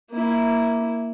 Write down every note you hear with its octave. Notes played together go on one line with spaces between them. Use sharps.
A#3 E4